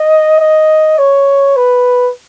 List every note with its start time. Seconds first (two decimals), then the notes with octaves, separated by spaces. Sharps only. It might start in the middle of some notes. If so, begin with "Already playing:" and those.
Already playing: D#5
0.40 D#5
0.98 C#5
1.57 B4